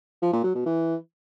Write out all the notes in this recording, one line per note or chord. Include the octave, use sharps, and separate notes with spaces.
F3
A#2
F#3
B2
E3